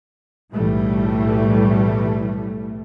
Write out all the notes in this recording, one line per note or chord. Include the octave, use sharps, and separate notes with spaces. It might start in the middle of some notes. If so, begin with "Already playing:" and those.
B1 A2 E3 G3 A3